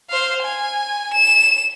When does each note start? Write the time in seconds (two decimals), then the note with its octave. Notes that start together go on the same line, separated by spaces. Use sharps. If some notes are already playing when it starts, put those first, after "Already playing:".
0.10 C5 F5
0.43 G#5
1.14 E7